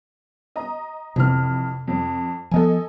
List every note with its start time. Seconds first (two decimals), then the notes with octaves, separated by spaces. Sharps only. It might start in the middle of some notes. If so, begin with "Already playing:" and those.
0.56 D#5 A#5
1.16 F2 C3 E3 F6
1.88 F2
2.51 F3 B3 A4 D#5 G#5